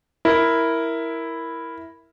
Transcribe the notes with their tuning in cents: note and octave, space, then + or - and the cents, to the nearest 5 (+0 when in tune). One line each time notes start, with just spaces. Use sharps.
E4 +0 A#4 +0